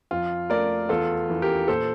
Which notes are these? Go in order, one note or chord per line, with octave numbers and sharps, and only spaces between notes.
F2 F4
A3 A#4 D5
E2 F4 A4
E3
G4 A#4
A#2 A4 C5